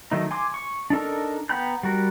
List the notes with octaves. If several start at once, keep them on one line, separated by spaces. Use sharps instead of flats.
D#3 F#3 A3 D#4
G#5 C6 D6
C#6
D4 D#4 A4 A#4
B3 G5 A#5 B5 G6
G3 F#4 A#4